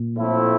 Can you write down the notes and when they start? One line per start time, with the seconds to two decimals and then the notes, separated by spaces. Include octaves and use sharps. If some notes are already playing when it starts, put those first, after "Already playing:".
Already playing: A#2
0.17 A2 F3 A3 C4 E4